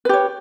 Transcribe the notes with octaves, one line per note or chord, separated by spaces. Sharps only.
G4 B4 C#5